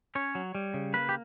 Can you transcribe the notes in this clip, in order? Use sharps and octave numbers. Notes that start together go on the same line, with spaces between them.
C#4 C#5
F#3
G3
C#3
A#3 B4
G4